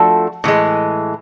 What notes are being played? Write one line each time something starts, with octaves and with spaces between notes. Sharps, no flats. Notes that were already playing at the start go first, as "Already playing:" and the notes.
Already playing: F3 A3 D4 F#4 A4
A2 E3 G#3